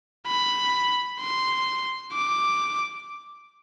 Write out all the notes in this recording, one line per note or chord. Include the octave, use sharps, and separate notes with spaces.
B5
C6
D6